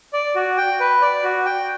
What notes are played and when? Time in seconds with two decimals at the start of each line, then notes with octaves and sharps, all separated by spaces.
0.13 D5
0.35 F#4
0.57 G5
0.80 B4
1.02 D5
1.23 F#4
1.46 G5